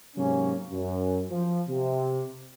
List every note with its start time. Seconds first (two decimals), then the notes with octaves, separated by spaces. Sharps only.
0.17 G#2 C3 F#3 A#3 C#4
0.72 F#2
1.31 F3
1.69 C3